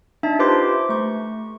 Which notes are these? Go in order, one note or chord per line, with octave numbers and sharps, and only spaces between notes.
D4 D#4 E5 A5
F4 G4 B4 C5 C6 D6
A3 C#6